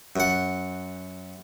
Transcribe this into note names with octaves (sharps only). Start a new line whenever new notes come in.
F#2 F#5